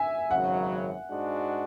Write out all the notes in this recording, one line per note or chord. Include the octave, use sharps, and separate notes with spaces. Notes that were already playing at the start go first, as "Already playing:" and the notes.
Already playing: E5 G#5
G#1 F#2 C#3 F#3 F#5
G#2 G#3 D4 F#4